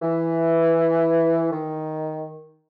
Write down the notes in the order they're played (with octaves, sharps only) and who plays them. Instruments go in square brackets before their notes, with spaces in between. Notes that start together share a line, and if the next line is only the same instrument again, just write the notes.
[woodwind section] E3
D#3